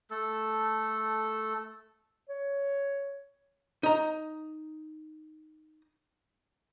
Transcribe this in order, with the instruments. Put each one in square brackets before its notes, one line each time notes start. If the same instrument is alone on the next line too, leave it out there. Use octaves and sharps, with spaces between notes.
[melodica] A3 A4
[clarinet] C#5
[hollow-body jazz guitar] D#4 A#5